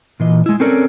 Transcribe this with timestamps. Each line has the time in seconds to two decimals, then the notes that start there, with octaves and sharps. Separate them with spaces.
0.20 A#2 E3 D#5
0.46 G#3 E4
0.60 C4 C#4 A4 A#4 C#5 D5